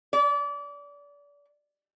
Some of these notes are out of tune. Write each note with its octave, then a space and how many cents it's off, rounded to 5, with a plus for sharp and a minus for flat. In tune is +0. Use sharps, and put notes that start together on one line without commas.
D5 -30